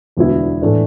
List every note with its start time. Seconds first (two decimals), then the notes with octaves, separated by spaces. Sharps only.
0.17 E1 D2 D3 B3 E4
0.62 A2 E3 A3 D4